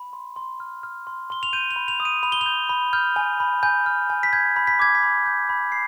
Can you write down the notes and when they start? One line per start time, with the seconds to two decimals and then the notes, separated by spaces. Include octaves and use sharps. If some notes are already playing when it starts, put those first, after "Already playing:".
Already playing: B5
0.13 C6
0.36 C6
0.60 F6
0.83 F6
1.07 C6
1.30 C6 G7
1.43 F7
1.53 G6 D#7
1.71 F7
1.76 B5
1.88 F7
2.00 D#6
2.05 D#7
2.23 B5 F7
2.32 G7
2.41 F7
2.46 G6
2.69 B5
2.93 F6 G6
3.16 G#5
3.40 B5
3.63 G#5 G6
3.86 F6
4.10 G#5
4.23 B6
4.33 G6 G#6
4.56 B5
4.67 B6
4.79 D6 G#6
4.95 B6
5.03 B5
5.26 G6
5.49 B5
5.72 C7